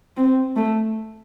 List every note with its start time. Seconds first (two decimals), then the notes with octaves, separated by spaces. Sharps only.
0.17 C4
0.56 A3